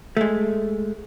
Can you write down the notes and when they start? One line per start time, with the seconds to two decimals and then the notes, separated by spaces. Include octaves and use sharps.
0.17 G#3 A3